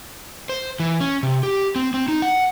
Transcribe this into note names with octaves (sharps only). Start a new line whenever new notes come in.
C5
E3
C#4
C3
G4
C4
C4
D#4
F#5